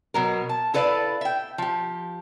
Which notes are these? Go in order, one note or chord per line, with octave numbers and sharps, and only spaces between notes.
B2 F#3 A#4
A5
E4 A4 B4 D5 F5
E5 G5
F3 G4